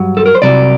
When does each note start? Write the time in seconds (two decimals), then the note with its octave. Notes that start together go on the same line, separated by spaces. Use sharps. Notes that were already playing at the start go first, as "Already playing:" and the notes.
Already playing: G2 F#3
0.17 A4
0.26 A#4
0.35 C5
0.42 C2 C3 F#3 D5